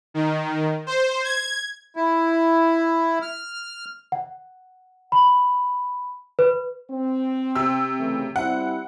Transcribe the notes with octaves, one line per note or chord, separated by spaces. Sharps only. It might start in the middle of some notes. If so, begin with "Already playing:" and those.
D#3
C5
G#6
E4
F6
F#5
B5
B4
C4
C3 E6
C#3 E3 A3
G3 C4 E4 F#5